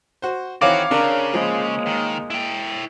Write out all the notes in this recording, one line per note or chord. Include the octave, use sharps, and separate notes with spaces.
F#4 C5
D#3 E3 C4 F#4 C#5 F5 D6
C#3 D4 A#4
F3 G#3 A#3
D#3
E4 G5